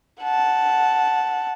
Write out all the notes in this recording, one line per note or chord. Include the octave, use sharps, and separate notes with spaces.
F#5 A5